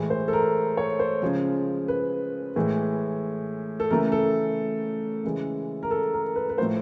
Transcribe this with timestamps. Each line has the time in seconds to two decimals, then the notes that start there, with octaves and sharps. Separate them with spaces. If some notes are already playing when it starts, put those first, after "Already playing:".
Already playing: A2 E3 G#3
0.10 C5
0.28 A4
0.33 A#4
0.77 C#5
0.99 C5
1.22 C#3 F3 G#3
1.88 B4
2.56 A2 E3 G#3
3.80 A4
3.91 C#3 E3 A3 A#4
4.12 A4
5.24 C#3 E3 G#3
5.83 A#4
5.91 A4
6.13 A#4
6.36 B4
6.49 B4
6.58 A2 F3 A3 C5